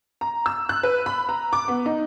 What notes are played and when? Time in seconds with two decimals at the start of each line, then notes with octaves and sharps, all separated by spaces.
0.21 A#5
0.46 E6
0.69 F#6
0.83 B4
1.06 B5
1.29 A#5
1.53 D6
1.68 B3
1.86 D#4